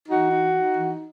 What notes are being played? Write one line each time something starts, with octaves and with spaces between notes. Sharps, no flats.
E3 D#4 F#4
D#4
D#4
E3